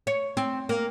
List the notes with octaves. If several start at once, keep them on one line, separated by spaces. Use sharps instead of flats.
C#5
C4
A#3